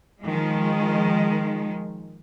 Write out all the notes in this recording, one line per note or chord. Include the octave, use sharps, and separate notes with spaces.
D#3 F3 G#3